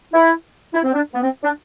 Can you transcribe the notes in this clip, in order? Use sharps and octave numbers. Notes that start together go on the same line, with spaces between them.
E4
E4
C4
D4
B3
C4
D4